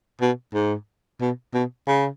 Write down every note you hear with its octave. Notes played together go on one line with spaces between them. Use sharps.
B2
G#2
B2
B2
C#3